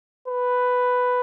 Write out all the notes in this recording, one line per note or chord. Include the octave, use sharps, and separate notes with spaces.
B4